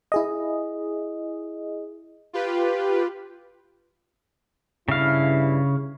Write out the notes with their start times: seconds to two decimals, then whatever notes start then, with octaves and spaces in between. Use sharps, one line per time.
0.12 E4 G#4 D#5
2.33 F4 G4 B4
4.89 G2 C#3 E4 F5